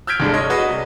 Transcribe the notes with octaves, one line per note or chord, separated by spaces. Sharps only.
E6 F6 G6 G#6 B6 D7
G1 C2 G2 G#3 A4
D4 C#5 D#5
F#4 G#4 B4 D#5
C2